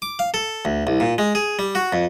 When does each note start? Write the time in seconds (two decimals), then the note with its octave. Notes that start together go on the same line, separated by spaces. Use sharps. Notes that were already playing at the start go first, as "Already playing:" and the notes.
0.02 D6
0.19 F5
0.34 A4
0.65 D2
0.87 C2
1.00 A#2
1.18 G#3
1.35 G#4
1.59 G3
1.75 F#4
1.93 F2